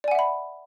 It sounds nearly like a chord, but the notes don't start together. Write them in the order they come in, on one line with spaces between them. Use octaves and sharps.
D5 G#5 F#5 E5 B5